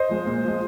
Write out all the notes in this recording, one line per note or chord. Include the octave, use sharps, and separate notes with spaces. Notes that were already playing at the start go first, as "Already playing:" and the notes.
Already playing: C5 D#5
F3 G#3
A#2
F3 G#3